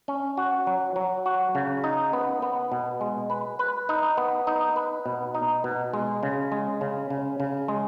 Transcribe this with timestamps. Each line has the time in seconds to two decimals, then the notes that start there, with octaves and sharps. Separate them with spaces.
0.08 C#4
0.37 F#4
0.67 F#3
0.96 F#3
1.26 F#4
1.55 C#3
1.84 D#4
2.13 B3
2.42 B3
2.72 B2
3.01 G#3
3.30 B4
3.59 B4
3.89 D#4
4.17 B3
4.47 D#4
4.76 B4
5.06 B2
5.35 D#4
5.64 B2
5.94 G#3
6.23 C#3
6.52 G#3
6.81 C#3
7.10 C#3
7.40 C#3
7.68 G#3